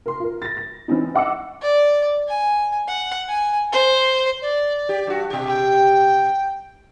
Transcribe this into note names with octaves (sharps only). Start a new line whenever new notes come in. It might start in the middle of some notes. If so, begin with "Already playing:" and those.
A#4 C6
F4 A#4
A6 A#6
A#6
E3 C4 C#4 D#4
D#5 F#5 D6 E6 C#7
D5
G#5
F#5
G#5
C5
D5
G4
G2 F#4
B2 G4
G5